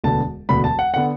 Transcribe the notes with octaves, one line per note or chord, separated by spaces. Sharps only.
E1 D2 D3 B3 A5
E1 D2 D3 B3 B5
A5
F#5
D3 B3 F#5